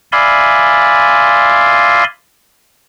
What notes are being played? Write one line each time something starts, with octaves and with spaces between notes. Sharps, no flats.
D5 E5 F5 G#5 B5 C6